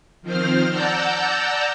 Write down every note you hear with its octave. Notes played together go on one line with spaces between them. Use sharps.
D#3 F3 C4 C5 F6
D5 F#5 A5 A#5 E6 G6